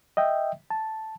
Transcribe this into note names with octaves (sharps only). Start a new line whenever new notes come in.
D#5 E5 G5
A5